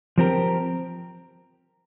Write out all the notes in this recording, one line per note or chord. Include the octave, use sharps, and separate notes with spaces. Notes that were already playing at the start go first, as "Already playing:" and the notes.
F3 C4 G4 A#4